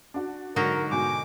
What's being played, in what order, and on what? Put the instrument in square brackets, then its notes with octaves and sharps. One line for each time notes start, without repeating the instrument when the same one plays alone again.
[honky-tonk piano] D4 F#4
[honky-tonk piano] G#2 F#3 [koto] D3 D#4 F#4 [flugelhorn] A#4
[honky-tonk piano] G#2 B2 G6 [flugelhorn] G#5 [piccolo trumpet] D6